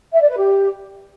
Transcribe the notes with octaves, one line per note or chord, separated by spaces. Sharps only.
E5
D5
B4
G4